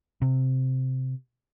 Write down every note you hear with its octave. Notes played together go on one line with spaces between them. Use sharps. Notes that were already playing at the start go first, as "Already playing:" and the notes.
C3